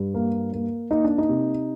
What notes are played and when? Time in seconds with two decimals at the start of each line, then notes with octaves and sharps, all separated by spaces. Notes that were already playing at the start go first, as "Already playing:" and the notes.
Already playing: G2 G3
0.14 A#3
0.53 A#3
0.91 A#3 D#4
1.04 D4
1.18 D#4
1.29 C3